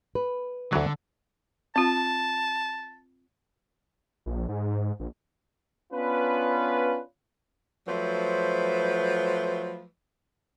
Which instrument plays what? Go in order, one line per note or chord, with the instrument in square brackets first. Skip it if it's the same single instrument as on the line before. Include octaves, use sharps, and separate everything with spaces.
[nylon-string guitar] B4
[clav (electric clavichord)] D2 E3 F#3 [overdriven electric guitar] D3
[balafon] C4 F4 [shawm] A5
[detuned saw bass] A#1
G#2
A#1
[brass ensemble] B3 C#4 D4 F4 B4
[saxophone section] F3 F#3 A3 B4 C5